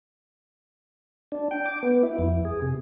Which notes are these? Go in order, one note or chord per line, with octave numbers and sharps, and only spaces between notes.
D4
G5
D6
B3
E4
F2
G#4
C3